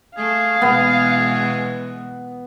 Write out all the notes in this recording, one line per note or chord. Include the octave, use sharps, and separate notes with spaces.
A3 G#4 F5
B2 E3 G#3 B3